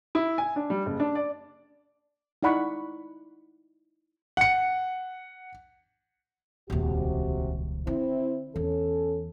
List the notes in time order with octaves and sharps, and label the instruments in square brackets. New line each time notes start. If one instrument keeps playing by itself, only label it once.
[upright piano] E4
G#5
D4
G3
F#1
D4
D5
[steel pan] D#4 E4 D5 F#5 B5 C#6
[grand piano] F#5 C#7
[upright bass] D#1 C#2 [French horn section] C3 F#4 G4
[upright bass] D3 [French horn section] C4 E4
[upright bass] E2 [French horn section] C#4 A4